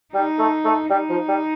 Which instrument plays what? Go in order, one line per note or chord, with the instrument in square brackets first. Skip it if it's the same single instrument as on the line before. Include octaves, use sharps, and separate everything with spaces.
[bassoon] G3 [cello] D#4
[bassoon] A3
A3
[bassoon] G3 [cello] D#4
[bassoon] F3
G3